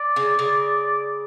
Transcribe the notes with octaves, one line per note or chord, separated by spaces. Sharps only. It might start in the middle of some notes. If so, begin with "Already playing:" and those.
Already playing: D5
C#3
C#3